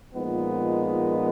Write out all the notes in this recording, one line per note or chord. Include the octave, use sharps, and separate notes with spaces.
A#2 F3 G#3 B3 D#4